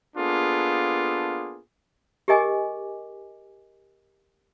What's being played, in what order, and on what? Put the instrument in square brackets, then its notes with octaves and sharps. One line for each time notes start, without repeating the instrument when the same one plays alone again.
[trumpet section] A#3 B3 D4 F4 G#4 A4
[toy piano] G4 G#4 A#4 D#5 G#5 D6